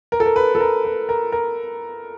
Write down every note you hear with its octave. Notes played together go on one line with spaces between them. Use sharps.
A#4
A4
A#4
B4
A4
A#4
B4
A#4
A#4